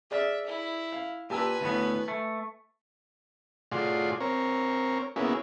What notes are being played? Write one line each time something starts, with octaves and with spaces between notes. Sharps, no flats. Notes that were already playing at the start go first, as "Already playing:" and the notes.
G#4 D5 E5 F6
E4
F5
A#2 G4 B4 G#5 A5 E6
D2 A2 B3
A3
A2 F4 F#4 G#4 D5 C6
C4 A#4 C#5
A#3 B3 C#4 E4 F#4 G#4